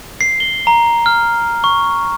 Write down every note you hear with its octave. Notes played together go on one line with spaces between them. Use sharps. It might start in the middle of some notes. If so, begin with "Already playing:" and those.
C7
G7
A#5
F6
C#6